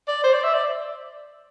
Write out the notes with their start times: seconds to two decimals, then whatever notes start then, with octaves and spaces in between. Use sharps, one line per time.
0.08 D5
0.24 C5
0.33 D5
0.44 E5
0.54 D5